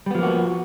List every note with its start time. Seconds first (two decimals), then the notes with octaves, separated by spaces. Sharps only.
0.06 G3
0.11 B3
0.15 F3
0.19 A#3
0.23 F#4